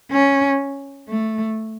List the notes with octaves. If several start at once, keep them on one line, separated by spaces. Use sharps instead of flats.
C#4
A3